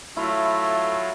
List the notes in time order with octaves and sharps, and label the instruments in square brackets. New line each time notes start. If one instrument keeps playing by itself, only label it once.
[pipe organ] F#3 F4 [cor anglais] A3 [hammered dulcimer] E4